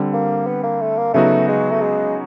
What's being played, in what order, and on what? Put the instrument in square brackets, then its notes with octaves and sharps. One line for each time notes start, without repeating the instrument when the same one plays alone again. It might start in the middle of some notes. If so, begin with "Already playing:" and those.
Already playing: [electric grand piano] D3 G3 C4
[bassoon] A#3
B3
A#3
A3
A#3
[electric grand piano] C#3 F#3 B3 D#4 F#4 [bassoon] A3
[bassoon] G#3
A3
G#3